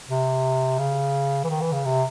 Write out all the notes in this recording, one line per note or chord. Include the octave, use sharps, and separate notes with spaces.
C3
C#3
E3
D#3
E3
C#3
C3